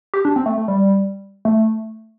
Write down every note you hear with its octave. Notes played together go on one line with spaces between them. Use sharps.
G4
D4
C4
A3
A3
G3
A3